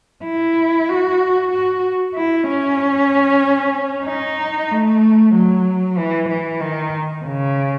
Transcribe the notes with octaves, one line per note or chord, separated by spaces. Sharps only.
E4
F#4
F#4
E4
C#4
D#4
A3
F#3
E3
E3
D#3
C#3